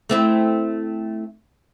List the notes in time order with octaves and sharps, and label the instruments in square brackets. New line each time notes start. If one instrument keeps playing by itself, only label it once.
[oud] A3 C4 E4